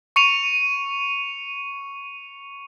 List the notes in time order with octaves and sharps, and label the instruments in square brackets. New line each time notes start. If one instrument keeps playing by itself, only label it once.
[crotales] C#6 C#7 D#7 F7